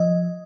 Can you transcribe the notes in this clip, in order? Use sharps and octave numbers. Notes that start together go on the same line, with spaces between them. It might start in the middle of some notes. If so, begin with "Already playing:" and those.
Already playing: F3 D#5